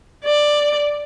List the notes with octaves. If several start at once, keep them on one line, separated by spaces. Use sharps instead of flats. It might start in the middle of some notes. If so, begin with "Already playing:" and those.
D5